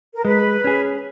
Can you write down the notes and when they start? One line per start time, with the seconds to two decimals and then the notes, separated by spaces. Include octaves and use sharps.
0.15 A#4
0.24 G#3 B4
0.64 C#4 G#4